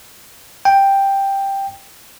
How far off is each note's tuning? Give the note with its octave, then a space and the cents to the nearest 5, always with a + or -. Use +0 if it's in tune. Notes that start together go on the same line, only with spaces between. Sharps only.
G5 +5